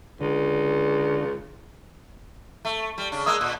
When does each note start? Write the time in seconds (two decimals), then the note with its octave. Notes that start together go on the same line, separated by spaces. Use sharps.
0.21 C#2 D3
2.65 A3
2.98 G3
3.12 C#3 D4
3.26 G#3 A#3 D#6 E6 F#6
3.41 A#2